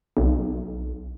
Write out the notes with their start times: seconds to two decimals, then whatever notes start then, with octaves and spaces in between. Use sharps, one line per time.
0.17 B1